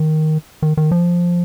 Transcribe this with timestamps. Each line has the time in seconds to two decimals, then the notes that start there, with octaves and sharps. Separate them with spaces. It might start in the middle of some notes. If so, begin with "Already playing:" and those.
Already playing: D#3
0.62 D#3
0.77 D#3
0.91 F3